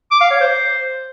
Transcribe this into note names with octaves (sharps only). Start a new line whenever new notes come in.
D6
F5
C#5
C5